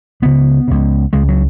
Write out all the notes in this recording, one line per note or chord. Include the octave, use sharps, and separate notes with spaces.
C#2 C#3 B3
C#2 C#3
C#2 C#3 G#3
F#3